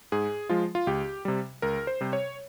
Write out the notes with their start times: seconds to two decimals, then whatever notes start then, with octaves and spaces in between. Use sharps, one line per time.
0.12 G#2 G#4
0.49 F3 G#3 F4
0.75 F4
0.87 C#2 G4
1.25 C3 G3
1.62 C#2 A#4
1.87 C5
2.01 C3 G3
2.13 C#5